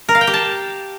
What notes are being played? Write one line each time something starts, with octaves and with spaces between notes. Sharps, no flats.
A#4
F5
G5
G4
A5